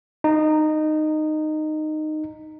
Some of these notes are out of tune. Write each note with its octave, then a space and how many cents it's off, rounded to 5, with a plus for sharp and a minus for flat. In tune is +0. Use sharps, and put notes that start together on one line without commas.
D#4 -15